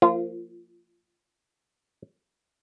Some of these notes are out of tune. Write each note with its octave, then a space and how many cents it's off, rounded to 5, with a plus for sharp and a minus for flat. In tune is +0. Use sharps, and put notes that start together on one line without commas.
F3 +0 A#3 -30 F4 -30